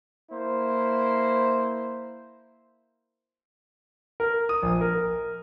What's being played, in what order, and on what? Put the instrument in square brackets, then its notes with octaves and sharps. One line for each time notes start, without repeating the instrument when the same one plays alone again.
[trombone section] A#3 E4 C5
[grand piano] A#4
D#6
A#1
A#4